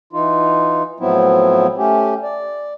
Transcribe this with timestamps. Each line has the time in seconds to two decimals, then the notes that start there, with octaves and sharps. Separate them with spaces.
0.13 E3 D#4 F4
1.00 A2 F3 F#3 B3 C4 E4
1.77 A3 C#4 G4
2.23 D5